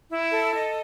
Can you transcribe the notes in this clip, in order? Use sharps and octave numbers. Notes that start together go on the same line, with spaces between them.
E4
A4
D#5